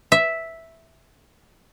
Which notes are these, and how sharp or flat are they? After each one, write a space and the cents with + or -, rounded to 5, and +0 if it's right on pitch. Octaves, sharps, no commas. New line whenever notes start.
E5 -5